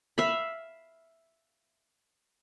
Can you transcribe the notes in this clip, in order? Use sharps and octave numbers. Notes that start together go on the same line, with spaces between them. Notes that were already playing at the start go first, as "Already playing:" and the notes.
E5 F5 B5